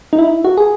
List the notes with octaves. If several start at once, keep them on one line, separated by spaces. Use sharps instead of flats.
D#4
E4
F#4
G#4